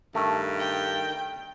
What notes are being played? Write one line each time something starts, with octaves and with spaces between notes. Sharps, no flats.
G2 D#3 A3
G5